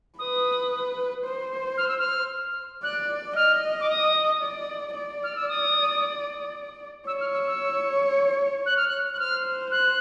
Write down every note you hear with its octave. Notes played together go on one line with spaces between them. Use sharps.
B4 D#6
C5
F6
E6
F6
D5 F#6
D#5 F6
D6
D#6
D5
D5
F6
E6
D#6
C#5 E6
F6
E6
E6
F#6
F6
F#6
F#6
C5 F6
F#6